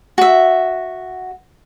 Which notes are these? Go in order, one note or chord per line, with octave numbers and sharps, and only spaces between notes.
F#4 E5